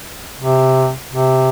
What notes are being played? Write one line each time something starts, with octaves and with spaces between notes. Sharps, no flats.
C3
C3